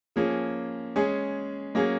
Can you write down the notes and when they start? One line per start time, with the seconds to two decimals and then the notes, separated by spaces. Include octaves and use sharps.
0.16 F3 A#3 C#4 G#4
0.96 G#3 C#4 G#4
1.75 F#3 A#3 C#4 G#4